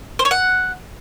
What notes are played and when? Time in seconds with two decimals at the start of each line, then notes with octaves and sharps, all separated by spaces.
0.19 C5
0.25 C#5
0.31 F#5